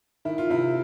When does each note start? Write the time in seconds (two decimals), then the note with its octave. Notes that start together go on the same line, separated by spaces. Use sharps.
0.25 D#3 E4
0.38 F4
0.50 C3 E4